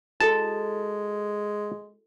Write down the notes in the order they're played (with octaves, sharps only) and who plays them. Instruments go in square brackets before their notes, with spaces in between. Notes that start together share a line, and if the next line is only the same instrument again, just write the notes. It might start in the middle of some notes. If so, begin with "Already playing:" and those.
[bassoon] G#3 [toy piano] E4 F#4 A4 [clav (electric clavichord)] A5